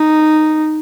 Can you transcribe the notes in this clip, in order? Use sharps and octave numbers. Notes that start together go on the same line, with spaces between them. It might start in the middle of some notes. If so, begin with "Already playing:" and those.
Already playing: D#4